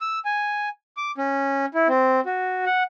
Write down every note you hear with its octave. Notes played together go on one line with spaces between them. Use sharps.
E6
G#5
D6
C#4
E4
C4
F#4
F#5